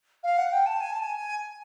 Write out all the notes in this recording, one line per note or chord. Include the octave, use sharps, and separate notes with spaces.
F5
F#5
G5
A5
G#5
A5
G#5